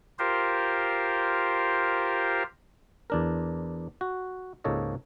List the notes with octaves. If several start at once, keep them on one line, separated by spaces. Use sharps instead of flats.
F4 G4 A#4 C5
E2 D4 A#4
F#4
C#2 G#2 A#3 A4 C#5 D#5